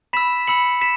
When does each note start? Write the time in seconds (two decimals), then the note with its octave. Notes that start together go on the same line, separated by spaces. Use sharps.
0.13 B5 E6 B6 E7
0.47 B5 E6 C#7 F#7
0.81 B6 E7